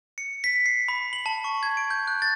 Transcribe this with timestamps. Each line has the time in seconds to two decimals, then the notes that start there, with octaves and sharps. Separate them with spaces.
0.18 C#7
0.44 B6
0.66 C7
0.88 B5
1.13 F#7
1.26 A5
1.44 C#6
1.63 G#6
1.77 D7
1.90 G6
2.07 F#6
2.22 A6